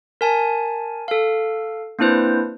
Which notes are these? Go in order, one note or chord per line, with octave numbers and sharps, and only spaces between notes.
A#4 G#5 A5
A4 F5
A#3 C4 D4 E4 B4 C5